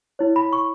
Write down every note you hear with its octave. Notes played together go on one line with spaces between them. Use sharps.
E4 C#5
B5
C#6